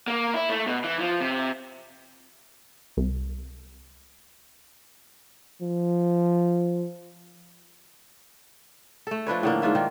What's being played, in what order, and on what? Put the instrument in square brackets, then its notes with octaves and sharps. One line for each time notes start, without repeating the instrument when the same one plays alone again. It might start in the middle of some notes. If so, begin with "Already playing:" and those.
[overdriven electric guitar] A#3
E4
A3
B2
E3
F3
C3
[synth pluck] C2
[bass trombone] F3
[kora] A3 A4
F3 D4 B4 C#5
A2 D3 A#3
G#2 D4 F4 E5
D#3